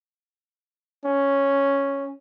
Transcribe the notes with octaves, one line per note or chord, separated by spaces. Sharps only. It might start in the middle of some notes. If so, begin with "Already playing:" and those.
C#4